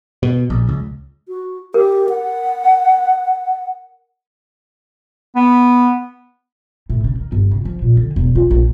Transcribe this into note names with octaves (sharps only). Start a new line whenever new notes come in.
B2
A#1
C#2
F#4
G4 A#4
F#5
B3
A2
C#3
D#3
G1
C#3
F3
A#2
D3
E1
F4
A#1